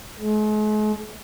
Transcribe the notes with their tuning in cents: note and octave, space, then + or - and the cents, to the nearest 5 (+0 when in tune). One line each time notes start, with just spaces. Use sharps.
G#3 +45